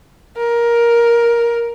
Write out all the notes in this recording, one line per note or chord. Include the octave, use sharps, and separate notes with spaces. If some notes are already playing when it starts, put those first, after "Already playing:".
A#4